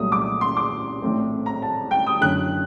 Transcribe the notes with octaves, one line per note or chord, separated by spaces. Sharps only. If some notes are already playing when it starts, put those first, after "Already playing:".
Already playing: C2 A#2 F#3 A3 D#6
D6
C6
D6
A#1 A2 A3 C4
A#5
A5
G5
D#6
F#1 F#2 D3 F#6